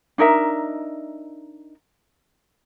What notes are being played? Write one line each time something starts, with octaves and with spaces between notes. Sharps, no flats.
D4 D#4 A#4 E5